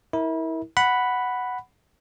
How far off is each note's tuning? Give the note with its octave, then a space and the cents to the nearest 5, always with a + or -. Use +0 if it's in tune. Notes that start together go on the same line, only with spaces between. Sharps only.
E4 -30 A#4 +0
F#5 +0 B5 +0